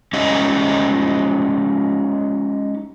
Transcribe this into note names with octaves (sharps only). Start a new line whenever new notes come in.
G#3 C#4 D#4 G4 D#5